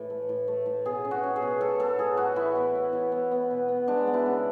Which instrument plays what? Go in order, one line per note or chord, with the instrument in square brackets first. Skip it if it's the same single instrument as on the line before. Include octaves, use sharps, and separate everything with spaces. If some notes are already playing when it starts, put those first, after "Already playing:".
Already playing: [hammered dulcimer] A2 E3
A3
A2
A3
A2
B2 G#4
C#4
F#4
C#4
G#4
B2
A2 A4
B3 A4
A2 G#4
A2 F#4
E3 E4
B3
B3
E3
B3
B3
B2
B3
G#3 D4
B3
E4
C#3